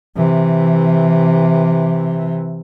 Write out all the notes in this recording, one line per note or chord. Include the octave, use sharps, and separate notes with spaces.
C3 E3